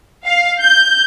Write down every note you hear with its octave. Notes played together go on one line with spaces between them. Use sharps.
F5
G6